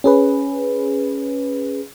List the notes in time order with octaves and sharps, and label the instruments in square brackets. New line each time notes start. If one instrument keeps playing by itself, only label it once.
[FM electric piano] C#4 G#4 B4